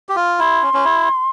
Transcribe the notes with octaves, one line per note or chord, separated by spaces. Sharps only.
G4
F4
E4 C6
C#4
C#4
E4